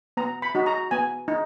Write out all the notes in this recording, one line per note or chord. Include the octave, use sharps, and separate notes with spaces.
B3 A#5
B5
D#4 F#4
A#5
B3 G#5
D#4